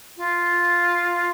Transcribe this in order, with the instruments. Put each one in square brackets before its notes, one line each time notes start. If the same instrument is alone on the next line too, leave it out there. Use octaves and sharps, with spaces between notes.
[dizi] F4